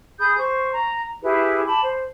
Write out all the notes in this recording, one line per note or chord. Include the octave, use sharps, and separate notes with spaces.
G#4 B5 D#6 G6
C5 C#6
A#5
E4 G4 G#4 B4
A5 B5 D6
C5